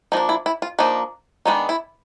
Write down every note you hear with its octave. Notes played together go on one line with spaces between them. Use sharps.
F3 A#3 D4 D#4
E4
E4
F4
F3 A#3 D4 D#4
D#3 G#3 B3 D4 D#4
E4